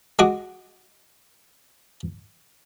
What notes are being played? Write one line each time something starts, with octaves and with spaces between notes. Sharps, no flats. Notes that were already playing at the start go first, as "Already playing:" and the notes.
G#3 F#4 D6